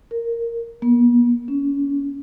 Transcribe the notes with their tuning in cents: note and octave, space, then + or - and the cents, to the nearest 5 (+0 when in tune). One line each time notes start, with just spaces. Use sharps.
A#4 -5
B3 -45
C#4 +25